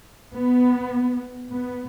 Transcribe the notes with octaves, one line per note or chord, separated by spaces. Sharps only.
B3
B3